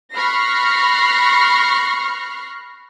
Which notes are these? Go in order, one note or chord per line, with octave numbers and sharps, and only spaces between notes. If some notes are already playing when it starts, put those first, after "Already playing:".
B5 C#6 F6 F#6 A#6 C7